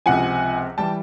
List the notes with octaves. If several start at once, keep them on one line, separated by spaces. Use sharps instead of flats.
C#2 C3 F3 F#5 G#5
E3 G3 G5 A5